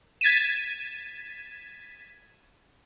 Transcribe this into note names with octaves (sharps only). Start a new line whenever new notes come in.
G#6 A6 B6 D#7 E7